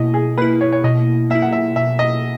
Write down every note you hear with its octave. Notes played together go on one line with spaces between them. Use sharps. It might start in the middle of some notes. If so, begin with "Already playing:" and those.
Already playing: B2 A#3 E4 D#5
G#4
A#3 E4 B4
C#5
C#5
B2 D#5
A#3 E4 E5
F#5
E5
B2 E5
D#5